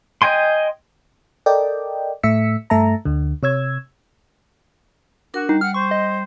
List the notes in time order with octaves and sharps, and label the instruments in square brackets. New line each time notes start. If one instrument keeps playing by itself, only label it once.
[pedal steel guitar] D#5 G5 G#5 C6
[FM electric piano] A4 A#4 D5 D#5 G5
A2 A3 E5 E6 B6 C#7
G2 A3 E5 A5 A#5
D2 D3
C3 C#5 E6 G#6
[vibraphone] D4 A#4 [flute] F#4
[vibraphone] G3 [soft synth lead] D#4
[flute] F#5 [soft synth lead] F6
[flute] C5 [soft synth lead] C#6
[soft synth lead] D#5